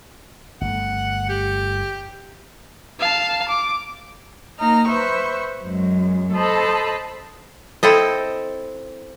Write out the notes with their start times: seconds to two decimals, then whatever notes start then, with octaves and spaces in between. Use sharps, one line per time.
0.61 G1 A3 F#5
1.29 G4
3.00 F5 A5
3.48 D6
4.59 A#3 D#4 A#5 F6
4.87 B4 C5 E5 C#6
5.64 F#2 G#3
6.32 A4 C5 D#5 A5 B5
7.83 C4 E4 A4 D#5